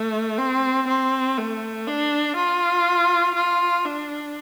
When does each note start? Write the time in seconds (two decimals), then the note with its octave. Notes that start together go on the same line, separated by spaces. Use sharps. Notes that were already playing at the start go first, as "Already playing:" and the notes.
Already playing: A3
0.38 C4
0.88 C4
1.38 A3
1.87 D4
2.36 F4
3.35 F4
3.85 D4